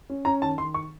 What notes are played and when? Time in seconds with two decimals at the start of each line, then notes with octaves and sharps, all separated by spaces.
0.10 C#4
0.25 C#4 A#5
0.42 D#3 A5
0.58 D#3 C6
0.74 C#6